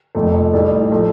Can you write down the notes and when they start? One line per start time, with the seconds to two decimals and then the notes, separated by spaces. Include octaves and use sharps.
0.15 F1 F2 F3 A3
0.53 A1 A2 G3 A4
0.92 F3 A3